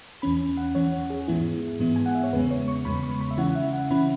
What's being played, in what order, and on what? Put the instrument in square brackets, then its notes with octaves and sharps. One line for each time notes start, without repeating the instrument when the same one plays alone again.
[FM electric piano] E2 E3 C#4 B5
F#5
E2 E3 C#4 C#5
G#4
G#2 E3 B3 E4
G#2 E3 B3 E4
G#5
F#5
E5
C#5
E2 C#3 G#3 B3 B4
C#5
C#6
E2 C#3 G#3 B3 B5
C#6
B5
E5
C#3 E3 C#4 E4 F#5
F#5
E5
F#5
C#3 E3 C#4 E4 B5